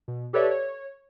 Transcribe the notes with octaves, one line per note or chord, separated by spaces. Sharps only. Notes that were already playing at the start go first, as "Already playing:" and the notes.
B2
G4 A4 B4 C#5 D5 E5
C#5